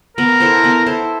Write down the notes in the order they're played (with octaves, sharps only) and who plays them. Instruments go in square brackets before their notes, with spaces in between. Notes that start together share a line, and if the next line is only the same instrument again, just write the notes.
[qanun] B3 [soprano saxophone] A#4
[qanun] E4 A4 C5
B3
E4 A4 C5